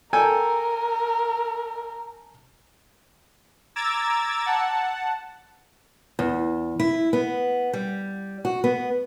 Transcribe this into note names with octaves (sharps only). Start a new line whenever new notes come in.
A4 A#4 G5 G#5
A#5 D6 E6 G#6 A6
F#5 A5
E2
E4
B3
G3
F#4
B3